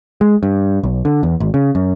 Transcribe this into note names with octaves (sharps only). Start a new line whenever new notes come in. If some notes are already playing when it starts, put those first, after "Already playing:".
G#3
G2
B1
D3
E2
G#1
C#3
F#2